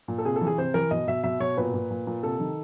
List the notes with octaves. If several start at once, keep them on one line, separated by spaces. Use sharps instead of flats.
A#2
A4
C3 G#4
A4
E3
G#4
C3 C5
E3 A#4
B2 D#5
B2 E5
B2 E5
B2 C#5
A#2 B4
A#2
A#2
A#2
C3 A4
D#3